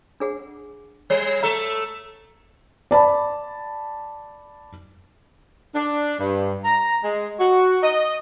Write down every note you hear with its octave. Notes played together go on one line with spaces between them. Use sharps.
D4 G#4 F#5
G3 C#5
A3 A4 E5 A#5
D5 A5 B5
D4
G2
A#5
G#3
F#4
D#5